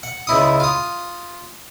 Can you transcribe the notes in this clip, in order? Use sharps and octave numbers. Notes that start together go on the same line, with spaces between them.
F#5
C#2 E4 D#6
F4 D#6